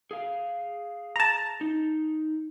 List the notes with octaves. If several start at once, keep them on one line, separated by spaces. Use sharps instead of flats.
G#4 F5
A5 A#5
D#4